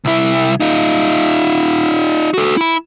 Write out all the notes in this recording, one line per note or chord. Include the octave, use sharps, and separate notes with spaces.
C2 E4
D#4 F4
F#4 A4
E4 B5